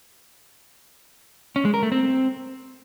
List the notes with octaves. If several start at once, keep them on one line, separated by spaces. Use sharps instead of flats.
C#4
G#3
A#4
A3
C4